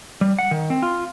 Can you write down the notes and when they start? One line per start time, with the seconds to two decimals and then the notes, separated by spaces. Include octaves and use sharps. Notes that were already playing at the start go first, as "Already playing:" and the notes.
0.21 G3
0.39 F#5
0.51 D#3
0.70 C4
0.82 F4